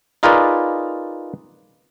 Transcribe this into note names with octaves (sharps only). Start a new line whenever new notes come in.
D#4 F4 G#4 A#4 B4 D5